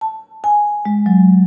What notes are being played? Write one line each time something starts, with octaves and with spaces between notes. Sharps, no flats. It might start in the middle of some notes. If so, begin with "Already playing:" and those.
A5
G#5
G#3
F#3